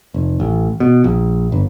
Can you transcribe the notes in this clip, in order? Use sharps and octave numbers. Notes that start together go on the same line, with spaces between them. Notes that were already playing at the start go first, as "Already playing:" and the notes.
F1
A1
B2
A#1
G1